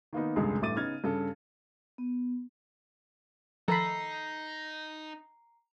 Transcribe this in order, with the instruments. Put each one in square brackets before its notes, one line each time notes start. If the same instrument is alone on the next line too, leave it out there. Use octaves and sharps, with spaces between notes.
[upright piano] D#3 A#3 B3 D#4
F1 C#2 G2 D3 G#3 G#4
A1 G2 A3 D6 A6 D#7
C#3 B3 D#4 F6 G#6 A6
G2 C#3 A4
[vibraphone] B3
[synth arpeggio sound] D#3 F3 [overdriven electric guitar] D#4 [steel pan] A4 B5 [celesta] A#5 C7